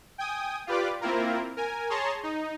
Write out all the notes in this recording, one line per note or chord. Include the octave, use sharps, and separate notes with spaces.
G5 G#5 D#6
F4 G4 B4 D5 D6
A#3 C4 E4 F4 A#4
A#4 G#5
G#4 C#5 A5 A#5 C6
D#4